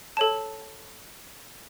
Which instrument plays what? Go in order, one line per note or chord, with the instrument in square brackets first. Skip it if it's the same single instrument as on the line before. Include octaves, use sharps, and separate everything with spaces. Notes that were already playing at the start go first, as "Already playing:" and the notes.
[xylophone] A4 C#5 A5